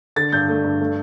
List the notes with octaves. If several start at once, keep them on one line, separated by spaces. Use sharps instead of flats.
D3 A6
G2 G6
A3
G2
A3